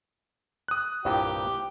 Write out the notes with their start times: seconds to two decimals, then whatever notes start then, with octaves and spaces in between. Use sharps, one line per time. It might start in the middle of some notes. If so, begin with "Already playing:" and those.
0.68 D#6 F#6
1.05 C2 G2 A#2 G4